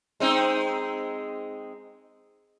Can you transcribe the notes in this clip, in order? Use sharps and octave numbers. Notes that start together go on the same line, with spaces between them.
G#3 C4 D#4